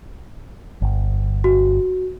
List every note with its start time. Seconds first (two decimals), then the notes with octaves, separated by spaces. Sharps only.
0.82 G1
1.44 F#4